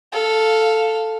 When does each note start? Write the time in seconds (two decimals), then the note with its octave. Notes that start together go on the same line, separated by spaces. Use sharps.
0.13 A4 F5